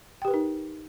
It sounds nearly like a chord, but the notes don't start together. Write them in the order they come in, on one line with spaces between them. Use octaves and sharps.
G5 G4 B4 A#4 D#4